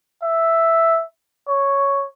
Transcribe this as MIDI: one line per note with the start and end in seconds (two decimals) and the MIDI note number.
0.23 1.04 76
1.48 2.06 73